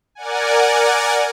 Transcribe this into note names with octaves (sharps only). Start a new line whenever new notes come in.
A#4 D5 F#5 G#5